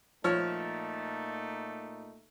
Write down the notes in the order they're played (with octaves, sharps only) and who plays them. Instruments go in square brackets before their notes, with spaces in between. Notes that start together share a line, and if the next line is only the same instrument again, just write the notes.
[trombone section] A#2 A3 D#4 [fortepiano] F3 C#5 F6